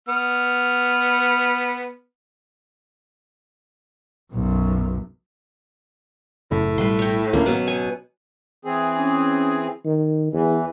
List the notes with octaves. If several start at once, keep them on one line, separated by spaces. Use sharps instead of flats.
B3 F6
B1 F#2
F#1 F#2 A2 C#3
A1 B2 G3 B4 C6
C#5 G5
D2 A3 A#3 C#4
G#1 B2 F#3 C#4
G#5 C#6
E3 C4 G#4
C#4
D#3
E2 E3